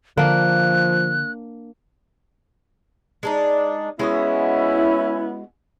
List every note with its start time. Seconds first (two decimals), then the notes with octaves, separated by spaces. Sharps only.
0.17 D3 F3 A#3 D4 F#6
3.23 G#3 D4 D#4
3.99 G#3 B3 C#4 E4 F#4 D#5